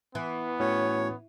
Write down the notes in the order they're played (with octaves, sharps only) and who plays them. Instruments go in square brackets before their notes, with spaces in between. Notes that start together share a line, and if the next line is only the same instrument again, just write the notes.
[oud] E3 [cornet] B3
[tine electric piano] A2 C#4 F#4 [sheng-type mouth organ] C#5